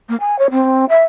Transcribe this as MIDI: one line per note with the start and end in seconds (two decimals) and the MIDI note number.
0.09 0.16 58
0.20 0.38 80
0.39 0.48 73
0.51 0.85 60
0.89 1.04 76